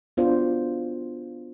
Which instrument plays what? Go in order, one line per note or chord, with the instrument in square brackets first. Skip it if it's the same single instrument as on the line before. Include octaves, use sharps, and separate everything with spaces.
[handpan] B3 D4 F4 F#4 C5 D5